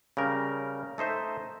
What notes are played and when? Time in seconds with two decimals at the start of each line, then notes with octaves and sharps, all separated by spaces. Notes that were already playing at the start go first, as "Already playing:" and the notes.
0.17 C#3 G3 A#4
0.98 A3 D#4 C5 E5